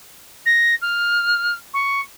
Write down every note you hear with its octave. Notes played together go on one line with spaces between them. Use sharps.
A#6
F6
C#6